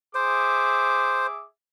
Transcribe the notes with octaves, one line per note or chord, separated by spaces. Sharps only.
G#4 C5 E5 D6